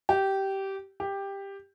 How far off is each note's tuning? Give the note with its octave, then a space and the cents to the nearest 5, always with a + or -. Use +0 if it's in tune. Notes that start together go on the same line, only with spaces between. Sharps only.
G4 -15
G4 +10